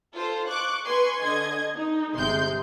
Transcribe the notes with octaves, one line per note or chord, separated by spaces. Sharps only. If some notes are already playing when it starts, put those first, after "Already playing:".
F4 A4 C5
C#6 D6 F#6
B4 G#5 C6 C#6
D3 D#5 G#6
D#4
G1 C3 G#3 C6 G6